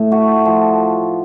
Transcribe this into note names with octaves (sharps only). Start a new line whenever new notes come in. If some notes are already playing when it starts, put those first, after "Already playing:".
Already playing: A2
A3 F#4
F3